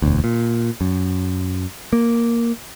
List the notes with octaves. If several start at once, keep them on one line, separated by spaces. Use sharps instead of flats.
E1 D2
A#2
F#2
A#3